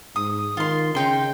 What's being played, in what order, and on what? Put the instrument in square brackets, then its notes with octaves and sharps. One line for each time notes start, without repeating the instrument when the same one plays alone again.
[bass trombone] G#2 [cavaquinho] D#6
[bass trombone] D#3 [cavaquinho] F4 C6
[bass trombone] C#3 [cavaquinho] D#4 G5 C6